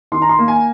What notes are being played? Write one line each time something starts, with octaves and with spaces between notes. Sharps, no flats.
D#3 C6
A#5
C6
A#3
G#5